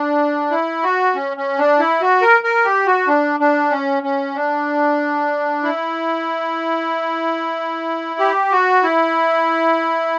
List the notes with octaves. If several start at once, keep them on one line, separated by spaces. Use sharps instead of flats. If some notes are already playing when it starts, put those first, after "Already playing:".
Already playing: D4
E4
F#4
C#4
C#4
D4
E4
F#4
A#4
A#4
G4
F#4
D4
D4
C#4
C#4
D4
E4
G4
F#4
E4